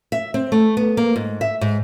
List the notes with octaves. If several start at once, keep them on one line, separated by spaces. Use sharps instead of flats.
E5
C4
A3
B3
A#3
G#2
E5
G#2